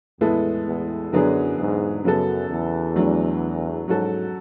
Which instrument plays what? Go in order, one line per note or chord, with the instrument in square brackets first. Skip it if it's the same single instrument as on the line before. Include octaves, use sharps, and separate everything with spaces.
[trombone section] E2 [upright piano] A2 G#3 B3 E4 A4
[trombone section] E2
[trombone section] F#2 [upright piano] D3 F#3 B3 D4 G#4
[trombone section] E2 G#2
[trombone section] F#2 [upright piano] C#3 F#3 B3 F#4 A4
[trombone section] E2
[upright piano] F#3 A3 D4
[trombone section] E2 G#2 [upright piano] F#3 C#4 F#4 A4